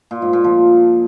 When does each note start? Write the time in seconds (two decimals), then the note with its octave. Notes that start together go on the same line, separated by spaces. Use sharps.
0.11 A#2
0.22 G#2
0.33 A#2
0.44 F3